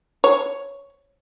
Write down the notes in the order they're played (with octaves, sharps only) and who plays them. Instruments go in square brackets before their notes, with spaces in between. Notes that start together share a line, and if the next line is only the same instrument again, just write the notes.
[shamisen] C#5